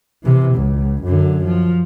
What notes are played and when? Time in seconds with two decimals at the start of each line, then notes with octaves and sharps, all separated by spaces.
0.23 C3 E3
0.55 C#2
1.04 F#2 D3
1.45 F3